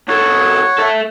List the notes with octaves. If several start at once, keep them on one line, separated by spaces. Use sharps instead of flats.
C2 A4 C#5 F#5
A4 E5